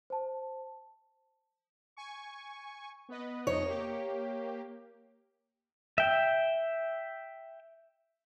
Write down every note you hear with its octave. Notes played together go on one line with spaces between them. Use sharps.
C5 A5
G#5 C#6
B3 B4 D#5
F2 D#4 C#5 D#5
A#3 G4
E5 G5